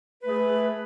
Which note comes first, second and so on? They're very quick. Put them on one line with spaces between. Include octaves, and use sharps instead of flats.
B4 A3 G#4